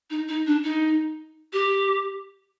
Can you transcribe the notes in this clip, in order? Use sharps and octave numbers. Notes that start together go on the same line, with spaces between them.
D#4
D#4
D4
D#4
G4